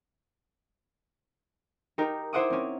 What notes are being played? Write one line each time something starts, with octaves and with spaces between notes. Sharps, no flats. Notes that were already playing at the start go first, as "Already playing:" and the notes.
D#4 G4 A#4
E4 C5 E5 F#5 D6 D#6
C4 C#4